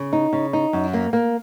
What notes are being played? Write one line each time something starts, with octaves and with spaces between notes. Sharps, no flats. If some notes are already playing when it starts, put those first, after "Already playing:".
Already playing: C#3
D#4
C#3
D#4
F#2
A#3
A#3